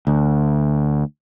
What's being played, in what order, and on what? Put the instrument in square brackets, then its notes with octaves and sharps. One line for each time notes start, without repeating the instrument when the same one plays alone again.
[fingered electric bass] D2